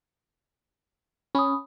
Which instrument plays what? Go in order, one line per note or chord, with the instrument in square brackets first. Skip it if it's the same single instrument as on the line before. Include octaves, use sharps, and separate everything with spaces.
[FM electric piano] C#4 [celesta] B5 D#6